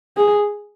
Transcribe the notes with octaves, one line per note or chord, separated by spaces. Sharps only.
G#4